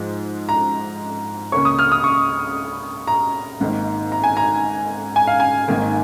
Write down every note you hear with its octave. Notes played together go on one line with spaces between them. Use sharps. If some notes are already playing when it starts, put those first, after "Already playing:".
Already playing: G#2 F3 G#3
A#5
C#2 C#3 A#3 C#4 C#6
D#6
F6
D#6
C#6
A#5
G#1 G#2 D#3 A#3 D#4
A#5
G#5
A#5
G#5
F5
G#5
G#1 G#2 D#3 A#3